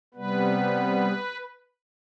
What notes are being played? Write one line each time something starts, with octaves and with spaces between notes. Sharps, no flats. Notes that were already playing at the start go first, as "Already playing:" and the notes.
C3 G3 B3 B4